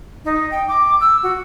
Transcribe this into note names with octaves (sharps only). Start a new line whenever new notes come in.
D#4
G5
D6
E6
F#4